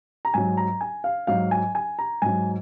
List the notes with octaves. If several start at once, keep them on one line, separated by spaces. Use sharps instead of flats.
A#5
G#2 F#3 G#5
A#5
G#5
F5
G#2 F#3 F5
G#5
G#5
A#5
G#2 F#3 G#5